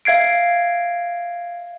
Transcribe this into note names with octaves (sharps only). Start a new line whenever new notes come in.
E5 F5 G#6 C7 D7